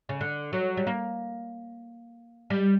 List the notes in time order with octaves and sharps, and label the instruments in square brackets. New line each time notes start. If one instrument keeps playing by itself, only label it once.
[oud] C#3
D3
F#3
G3
A#3
G3